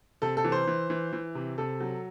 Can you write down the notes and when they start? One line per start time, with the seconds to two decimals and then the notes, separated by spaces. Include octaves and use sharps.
0.22 C3 A4
0.37 A4
0.44 E3
0.52 C5
0.67 E3
0.90 E3
1.13 E3
1.35 C3
1.58 C3 A4
1.81 F#3